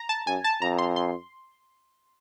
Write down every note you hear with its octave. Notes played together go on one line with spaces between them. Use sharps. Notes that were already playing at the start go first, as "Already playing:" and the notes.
Already playing: A#5
A5
F#2 G#5
A5
F2 A#5
C6
C6